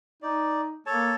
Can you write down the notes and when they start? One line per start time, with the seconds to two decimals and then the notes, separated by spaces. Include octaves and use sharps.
0.22 D#4 D5
0.86 A#3 A4 C#5 A5